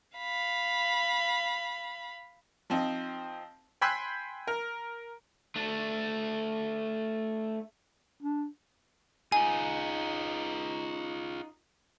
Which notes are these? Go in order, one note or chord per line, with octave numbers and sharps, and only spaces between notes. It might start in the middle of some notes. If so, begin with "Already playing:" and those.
F5 B5
F3 C4 D#4
G5 G#5 B5 C6 E6 F#6
A#4
A3 D4
D4
D#4 F4 G#4 G#5